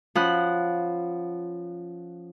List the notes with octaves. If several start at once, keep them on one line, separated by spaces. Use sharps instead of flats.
F3 C#4 F#5 B5 D#6 F#6